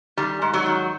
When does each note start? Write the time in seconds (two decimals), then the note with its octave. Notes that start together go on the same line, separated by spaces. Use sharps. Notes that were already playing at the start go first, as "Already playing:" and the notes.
0.17 D#3 G3
0.42 G#2
0.54 F#3
0.66 D#3